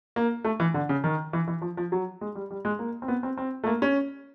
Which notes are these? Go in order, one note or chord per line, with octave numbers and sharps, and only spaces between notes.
A#3
A3
E3
D3
C#3
D#3
E3
E3
F3
F3
F#3
G#3
G3
G3
G#3
A#3
C4
B3
C4
C4
A3
A#3
C#4